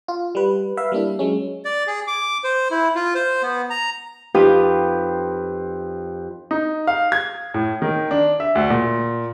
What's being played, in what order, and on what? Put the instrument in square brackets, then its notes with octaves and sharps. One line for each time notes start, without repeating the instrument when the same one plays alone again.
[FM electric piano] F4
G3 B4
B4 E5 F5
G3 A#3 D4 E4
F#3 G#3 C#4
[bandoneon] D5
G#4
D6
C5
E4
F4
C5
B3
A#5
[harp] F2 D#4 F4 G4 B4 D#6
[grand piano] D#4
F5
G#6
A2
D#3
D4
E5
D2
A#2